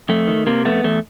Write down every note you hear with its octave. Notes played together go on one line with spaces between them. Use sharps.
F2 A3
D#3
C3 A#3
F2 A3 B3
E2 A3